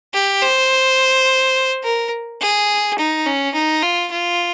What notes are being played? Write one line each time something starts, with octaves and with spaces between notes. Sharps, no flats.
G4
C5
A#4
G#4
D#4
C#4
D#4
F4
F4